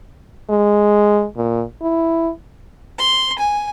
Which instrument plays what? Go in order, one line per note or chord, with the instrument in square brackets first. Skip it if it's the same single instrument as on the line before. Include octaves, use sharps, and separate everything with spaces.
[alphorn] G#3
A#2
E4
[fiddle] C6
G#5